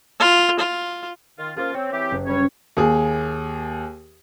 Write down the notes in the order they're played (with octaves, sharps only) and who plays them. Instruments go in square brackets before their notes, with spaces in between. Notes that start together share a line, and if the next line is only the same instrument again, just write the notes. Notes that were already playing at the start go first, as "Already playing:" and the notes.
[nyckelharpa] F4
F4
[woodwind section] D#3 F4
[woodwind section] A#3 C#4 F4 [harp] G#4 C5
[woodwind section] C4 [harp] C#5
[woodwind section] E3 C4 G4
[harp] F#1
[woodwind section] G2 G3 C#5 [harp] C#4 B4
[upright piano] D#2 G#4